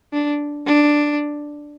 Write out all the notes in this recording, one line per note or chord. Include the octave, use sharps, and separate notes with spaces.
D4
D4